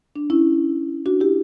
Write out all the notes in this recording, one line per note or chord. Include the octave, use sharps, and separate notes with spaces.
D4
C#4 E4
D4 F#4
E4 G4